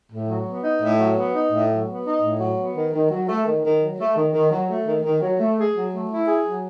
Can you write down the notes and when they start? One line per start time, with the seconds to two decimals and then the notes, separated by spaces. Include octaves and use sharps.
0.10 A2
0.28 F#3
0.45 B3
0.63 D#4
0.81 A2
0.99 F#3
1.16 B3
1.34 D#4
1.51 A2
1.70 F#3
1.87 B3
2.05 D#4
2.21 A2
2.39 F#3
2.57 B3
2.75 D#3
2.92 D#3
3.10 F#3
3.28 A3
3.46 D#3
3.63 D#3
3.80 F#3
3.98 A3
4.16 D#3
4.33 D#3
4.51 F#3
4.69 A3
4.86 D#3
5.04 D#3
5.21 F#3
5.38 A3
5.57 G#4
5.74 F#3
5.92 A3
6.10 E4
6.27 G#4
6.45 F#3